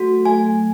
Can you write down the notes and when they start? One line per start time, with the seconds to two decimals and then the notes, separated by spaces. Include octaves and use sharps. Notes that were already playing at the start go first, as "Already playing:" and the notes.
Already playing: F#3 A3 F#4
0.25 A3 G#5